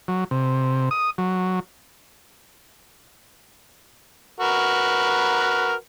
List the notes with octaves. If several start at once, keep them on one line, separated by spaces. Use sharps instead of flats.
F#3
C3
D#6
F#3
F#4 A#4 B4